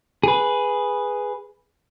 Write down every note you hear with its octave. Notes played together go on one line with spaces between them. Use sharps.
G#4 B4